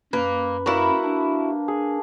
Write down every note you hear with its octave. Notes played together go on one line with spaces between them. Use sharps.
F#2 A#3 B4
A#3 E4 F#4
D4
G#4